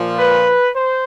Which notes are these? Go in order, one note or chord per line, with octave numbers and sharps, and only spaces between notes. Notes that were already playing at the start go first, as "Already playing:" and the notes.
Already playing: A#2 F3
B4
C5